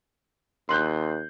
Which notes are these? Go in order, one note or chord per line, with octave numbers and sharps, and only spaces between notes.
D#2 C6 F#6 G6